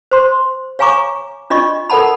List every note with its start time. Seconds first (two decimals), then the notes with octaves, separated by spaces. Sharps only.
0.11 C5 C6
0.79 C#5 F5 G#5 A#5 C#6 D6
1.50 D4 F4 D5 D#5 C#6
1.90 A4 A#4 D5 F#5 A5 B5